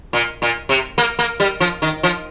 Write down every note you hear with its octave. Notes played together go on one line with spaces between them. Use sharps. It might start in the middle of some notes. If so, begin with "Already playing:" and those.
A#2
A#2
C3
A#3
A#3
G3
F3
D#3
F3